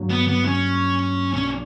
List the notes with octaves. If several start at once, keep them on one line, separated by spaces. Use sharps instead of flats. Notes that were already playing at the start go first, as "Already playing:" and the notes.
Already playing: G2 F#3 A#3 D4
B3
B3
C#4
B1 B2 A#3 C#4 D4